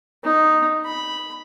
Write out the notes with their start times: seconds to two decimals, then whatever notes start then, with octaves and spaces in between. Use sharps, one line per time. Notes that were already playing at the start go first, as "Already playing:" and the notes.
0.24 D#4
0.85 B5